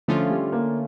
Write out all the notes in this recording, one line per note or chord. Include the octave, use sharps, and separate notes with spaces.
D3 F3 A3 C#4 F4
G3
A#3